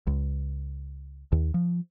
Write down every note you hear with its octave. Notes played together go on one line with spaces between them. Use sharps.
C#2
D#2
F3